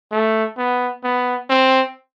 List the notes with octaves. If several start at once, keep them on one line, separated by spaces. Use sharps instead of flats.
A3
B3
B3
C4